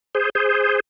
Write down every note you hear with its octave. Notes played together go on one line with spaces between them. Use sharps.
G#4 C5
G#4 C5